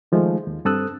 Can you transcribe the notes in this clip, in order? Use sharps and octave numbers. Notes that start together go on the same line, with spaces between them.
D#3 F3 G#3 A3
D#2
G2 C4 A4 D#6 E6 F#6